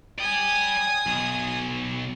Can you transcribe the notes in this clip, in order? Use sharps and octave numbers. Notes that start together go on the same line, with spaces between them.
D5 G5 G#5 D#6
B1